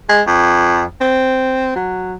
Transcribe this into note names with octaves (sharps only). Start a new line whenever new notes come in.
G#3
F2
C4
F#3